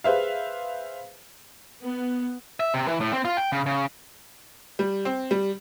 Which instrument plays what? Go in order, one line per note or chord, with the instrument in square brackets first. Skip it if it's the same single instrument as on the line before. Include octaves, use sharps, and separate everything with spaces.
[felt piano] G#4 B4 C5 E5 F5
[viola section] B3
[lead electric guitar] E5
C3
E3
A2
C4
F4
G5
C#3
C#3
[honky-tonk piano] G3
C4
G3